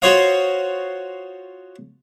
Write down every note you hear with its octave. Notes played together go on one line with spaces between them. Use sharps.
F4 F#4 C5 C#5 D#5 F5